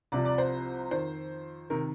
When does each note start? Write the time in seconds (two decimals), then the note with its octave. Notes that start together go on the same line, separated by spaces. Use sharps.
0.12 C2 C3 F3 D5
0.25 D5
0.38 C5
0.91 F2 D#3 C5
1.70 C3 D#3 A#4